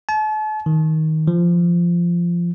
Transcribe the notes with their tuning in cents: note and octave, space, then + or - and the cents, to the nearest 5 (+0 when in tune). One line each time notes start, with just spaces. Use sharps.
A5 -40
D#3 +15
F3 -15